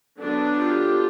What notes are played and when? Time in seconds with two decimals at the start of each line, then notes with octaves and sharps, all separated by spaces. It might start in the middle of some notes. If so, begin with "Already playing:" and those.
0.19 D3 F#3 B3 D4
0.56 F4 G4